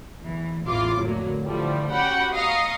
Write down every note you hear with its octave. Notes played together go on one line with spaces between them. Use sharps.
E2 E3
A1 E2 E3 F4 C6 D6
F2 A2 D3 F#3 A#3
D3 E3 F3 G3 A3
C#4 F#4 G4 F#5 G5 B5
D#5 F5 A#5 C#6 D#6 C7